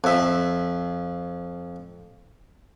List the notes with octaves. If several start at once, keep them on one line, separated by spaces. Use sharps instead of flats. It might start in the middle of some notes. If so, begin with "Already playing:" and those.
F2 E5